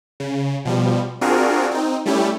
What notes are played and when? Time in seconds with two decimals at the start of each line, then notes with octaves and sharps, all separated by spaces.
0.20 C#3
0.65 B2 F3 G3
1.21 C4 D4 F4 F#4 G#4 A#4
1.71 C4 D#4
2.06 G3 A3 C#4 E4 G4